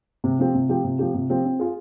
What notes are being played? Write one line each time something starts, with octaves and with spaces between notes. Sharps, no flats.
C3
F3 C4 G4
C3
F3 C4 G4
C3
F3 C4 G4
C3
F3 C4 G4
C4
F4 G#4